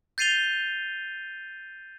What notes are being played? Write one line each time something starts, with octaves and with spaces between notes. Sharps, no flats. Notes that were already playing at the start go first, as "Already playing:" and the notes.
G6 A6 C7 D#7 F7 G7